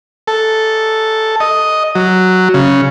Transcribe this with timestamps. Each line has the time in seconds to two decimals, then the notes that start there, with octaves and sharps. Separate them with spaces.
0.27 A4
1.40 D#5
1.95 F#3
2.54 C#3